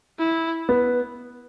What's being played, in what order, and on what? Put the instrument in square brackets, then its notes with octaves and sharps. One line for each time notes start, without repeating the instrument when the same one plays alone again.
[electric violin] E4
[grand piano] B3